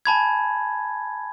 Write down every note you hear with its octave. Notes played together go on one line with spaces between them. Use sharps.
G#5 A5 B5 G#6